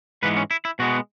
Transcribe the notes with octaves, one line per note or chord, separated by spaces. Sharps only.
G#2 E3 G#3 B3 B4
C#4
E4
E4
B2 G#3 B3 F#4